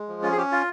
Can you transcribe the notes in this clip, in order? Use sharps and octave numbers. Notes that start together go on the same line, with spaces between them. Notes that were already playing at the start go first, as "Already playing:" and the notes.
Already playing: G#3
F3
C#4 F4
G#4
C#4 G4
F4